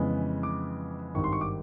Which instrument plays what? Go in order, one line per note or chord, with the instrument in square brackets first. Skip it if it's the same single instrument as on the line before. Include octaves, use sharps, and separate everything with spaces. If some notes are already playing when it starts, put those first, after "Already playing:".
Already playing: [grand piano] F2 C#3 E3 G#3 B3
D6
G#1 G2 D#3 C#6
C6
C#6
D6